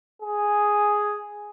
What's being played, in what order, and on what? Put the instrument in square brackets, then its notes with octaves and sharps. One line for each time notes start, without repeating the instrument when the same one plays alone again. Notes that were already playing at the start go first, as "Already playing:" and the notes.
[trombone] G#4